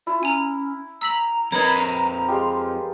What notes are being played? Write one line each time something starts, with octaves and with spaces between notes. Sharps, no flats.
E4 F4
C#4 G#5 A#5
A#5 E6 B6 F#7
F2 D#4 A#4 B4 C#5 B5 G#6
G#3 F4 G4